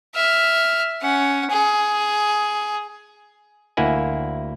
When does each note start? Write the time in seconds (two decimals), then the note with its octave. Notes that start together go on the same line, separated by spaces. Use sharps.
0.15 E5 F6
1.02 C#4 F#5
1.50 G#4
3.77 D2 A#3 E4 F#5 G#5